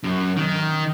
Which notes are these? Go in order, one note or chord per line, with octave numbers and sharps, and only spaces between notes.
F#2
D#3